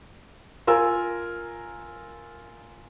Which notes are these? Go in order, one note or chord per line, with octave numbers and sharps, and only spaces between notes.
F4 A#4 G#5 E6